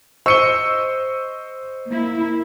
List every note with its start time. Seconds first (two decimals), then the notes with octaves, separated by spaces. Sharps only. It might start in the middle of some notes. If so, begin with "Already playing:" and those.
0.26 C5 D#5 C#6 E6 C#7 D#7 G7
1.90 A#3 E4